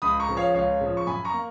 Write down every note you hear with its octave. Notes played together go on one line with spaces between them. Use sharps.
C#2 B5 D#6
A#5 C#6
C#3 F3
C#5 F5
C#2 C#5 F5
C#3 F3
C#6
F#2 G#5 B5
A#5 C#6
A#3